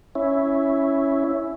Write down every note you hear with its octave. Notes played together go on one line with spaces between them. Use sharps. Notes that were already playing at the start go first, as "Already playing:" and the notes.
C#4 E4